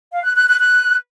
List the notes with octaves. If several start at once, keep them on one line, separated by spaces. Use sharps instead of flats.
F5
F#6
F#6
F#6
F#6